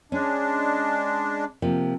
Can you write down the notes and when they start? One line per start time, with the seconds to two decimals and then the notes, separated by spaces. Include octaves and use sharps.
0.12 G#3 C#4 D4
1.62 C3 F3 A#3